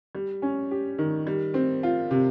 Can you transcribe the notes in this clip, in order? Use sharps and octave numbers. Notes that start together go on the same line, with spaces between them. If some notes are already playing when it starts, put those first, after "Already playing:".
G3
C#4
G4
D#3
G3
C4
F4
C3